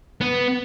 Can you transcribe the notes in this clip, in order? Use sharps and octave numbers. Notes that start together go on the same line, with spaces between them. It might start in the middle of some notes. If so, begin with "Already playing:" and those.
B3